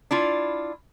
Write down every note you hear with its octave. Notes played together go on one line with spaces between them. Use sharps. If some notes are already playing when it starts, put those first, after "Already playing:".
D4 E4 F4